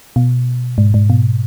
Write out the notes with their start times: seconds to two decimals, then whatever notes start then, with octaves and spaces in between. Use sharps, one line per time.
0.16 B2
0.78 G#2
0.94 G#2
1.10 B2